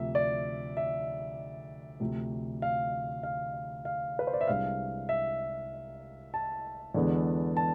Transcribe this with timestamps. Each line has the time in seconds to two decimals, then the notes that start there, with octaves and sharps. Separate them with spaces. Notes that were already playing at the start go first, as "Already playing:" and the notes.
Already playing: D2 C3 F3 E5
0.15 D5
0.77 E5
2.00 D2 C3 F3
2.62 F5
3.23 F5
3.85 F5
4.19 B4
4.27 C5
4.33 D5
4.41 E5
4.47 C2 C3 G#3 D4 F5
5.09 E5
6.34 A5
6.94 E2 D3 G#3 B3
7.57 A5